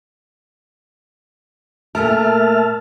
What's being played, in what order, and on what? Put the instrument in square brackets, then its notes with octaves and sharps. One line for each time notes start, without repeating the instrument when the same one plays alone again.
[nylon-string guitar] A#2 A3 A#4 [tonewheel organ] E5 A5 F6